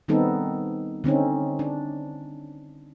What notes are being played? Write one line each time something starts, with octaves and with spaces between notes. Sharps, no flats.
D#3 G3 B3 C4 D#4 A4
D3 C4 C#4 D#4
D4